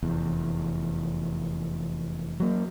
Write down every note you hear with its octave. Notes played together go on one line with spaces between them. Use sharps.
F1 E2
F#3 A#3